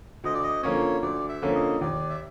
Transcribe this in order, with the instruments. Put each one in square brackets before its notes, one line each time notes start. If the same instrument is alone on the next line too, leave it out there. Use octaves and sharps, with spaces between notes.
[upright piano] D2 [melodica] D#5
[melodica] D5
D#5
[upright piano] D3 F3 A#3 C#4 [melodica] C#5
[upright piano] D2 [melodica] D5
[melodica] E5
[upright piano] D3 F3 A#3 C#4
[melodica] D#5
[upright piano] D#2 [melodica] D5
[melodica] E5